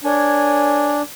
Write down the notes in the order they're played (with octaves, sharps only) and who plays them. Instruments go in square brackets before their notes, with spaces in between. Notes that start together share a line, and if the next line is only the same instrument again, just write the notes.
[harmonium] D4 [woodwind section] A#4 C#5 G#5